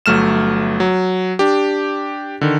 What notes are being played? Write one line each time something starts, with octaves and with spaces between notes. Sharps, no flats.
G1 F#3 A3 F6 E7
F#3
D4 G4
D3 D#3